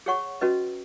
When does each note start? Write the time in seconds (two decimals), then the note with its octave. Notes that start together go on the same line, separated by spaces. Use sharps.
0.06 G#4 C#5 F#5 C#6
0.41 C#4 F#4 B4 D#5